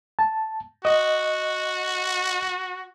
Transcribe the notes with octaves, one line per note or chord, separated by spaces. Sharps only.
A5
F#4 D#5